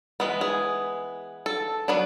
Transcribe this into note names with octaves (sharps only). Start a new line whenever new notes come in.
E3 G#3 B3
G#4
A4
F#3 B3 D4